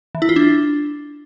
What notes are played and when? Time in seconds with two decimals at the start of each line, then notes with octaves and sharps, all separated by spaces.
0.15 E3
0.22 E4
0.29 F4
0.36 D4